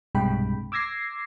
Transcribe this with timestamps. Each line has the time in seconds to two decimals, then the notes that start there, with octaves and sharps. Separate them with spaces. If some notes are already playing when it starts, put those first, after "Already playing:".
0.15 B1 G2 C3 G#3 G5 B5
0.72 D6 E6 G#6 A#6 C7